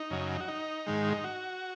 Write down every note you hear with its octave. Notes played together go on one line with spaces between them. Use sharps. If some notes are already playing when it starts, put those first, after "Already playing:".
Already playing: D#4
F#2 C#3 F#3
F#4
D#4
G#2 D#3 G#3
D#4
F#4